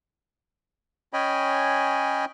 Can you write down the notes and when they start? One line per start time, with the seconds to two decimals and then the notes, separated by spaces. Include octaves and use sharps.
1.13 C#4 C#5 D#5 G5 G#5 B5